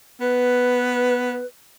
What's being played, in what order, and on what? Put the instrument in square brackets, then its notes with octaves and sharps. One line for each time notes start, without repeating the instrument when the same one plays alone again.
[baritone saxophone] B3 [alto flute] B4